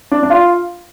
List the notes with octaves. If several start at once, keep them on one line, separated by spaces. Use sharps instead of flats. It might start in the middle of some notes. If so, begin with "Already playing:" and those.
D4
D4
F4